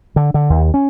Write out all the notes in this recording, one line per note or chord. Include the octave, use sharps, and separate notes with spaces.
D3
D3
D#2
C#4